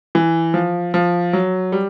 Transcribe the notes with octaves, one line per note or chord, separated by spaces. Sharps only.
E3
F3
F3
F#3
G3